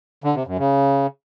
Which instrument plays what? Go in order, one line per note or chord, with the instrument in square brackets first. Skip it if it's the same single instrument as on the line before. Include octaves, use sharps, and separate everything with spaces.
[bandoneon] D3
C3
F#2
C#3